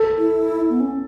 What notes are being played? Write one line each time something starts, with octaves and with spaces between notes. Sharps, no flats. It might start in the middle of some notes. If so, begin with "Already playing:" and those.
Already playing: A4
E4
B3
C#4